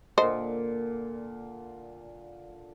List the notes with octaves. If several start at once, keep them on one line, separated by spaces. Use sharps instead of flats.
A#2 D3 A4 C5 D#5